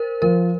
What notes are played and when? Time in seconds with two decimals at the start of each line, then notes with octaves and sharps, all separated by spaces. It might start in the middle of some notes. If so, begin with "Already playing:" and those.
Already playing: A#4 C5
0.22 F3 A#4